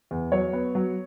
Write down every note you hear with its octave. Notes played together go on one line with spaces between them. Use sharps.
E2
F#3 C#5
B3
F#3